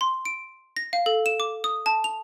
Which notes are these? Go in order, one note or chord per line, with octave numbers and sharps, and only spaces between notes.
C6
D7
A#6
F5
A4
E7
D6
D#6
A5
F7